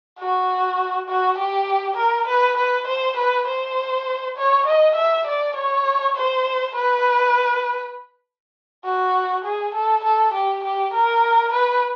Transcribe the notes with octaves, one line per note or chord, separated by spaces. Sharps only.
F#4
F#4
G4
A#4
B4
B4
C5
B4
C5
C#5
D#5
E5
D5
C#5
C5
B4
F#4
G#4
A4
A4
G4
G4
A#4
B4